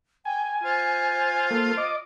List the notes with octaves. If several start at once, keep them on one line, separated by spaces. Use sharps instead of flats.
G5 G#5
F4 C5
A#3 A4
D#5 D6